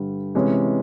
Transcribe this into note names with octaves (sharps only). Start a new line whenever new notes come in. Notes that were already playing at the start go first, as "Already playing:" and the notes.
Already playing: G2 D3 G3
C3 E3 G#3 C#4